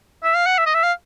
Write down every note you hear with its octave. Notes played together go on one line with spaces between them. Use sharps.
E5
F5
F#5
E5
D#5
E5
F5